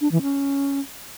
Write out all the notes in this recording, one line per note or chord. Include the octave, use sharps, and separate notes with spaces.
D4
E3
C#4